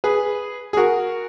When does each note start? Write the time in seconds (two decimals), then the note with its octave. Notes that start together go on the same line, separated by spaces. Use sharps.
0.04 G#4 B4
0.73 G#4
0.77 F#4 A#4